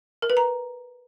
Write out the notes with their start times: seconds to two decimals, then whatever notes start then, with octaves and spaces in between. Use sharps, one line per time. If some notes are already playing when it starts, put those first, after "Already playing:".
0.22 A#4
0.30 B4
0.37 A#5